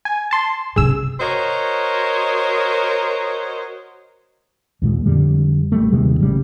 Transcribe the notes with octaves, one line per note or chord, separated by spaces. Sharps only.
G#5
A5 C6
C3 C#4 G#4 E6
F#4 A#4 C5 C#5 D#5
D#2 A#2 G#3
F2 D3 G3
A1 G3 A3
D#2 C3 G3 G#3
A1 C#3 F#3 G3